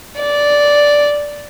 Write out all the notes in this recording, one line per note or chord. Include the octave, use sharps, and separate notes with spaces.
D5